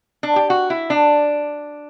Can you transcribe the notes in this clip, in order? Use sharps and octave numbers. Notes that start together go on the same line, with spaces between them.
D4
G4
F#4
E4
D4